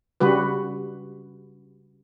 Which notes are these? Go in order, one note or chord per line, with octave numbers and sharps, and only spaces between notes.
C#3 G3 F#4 B4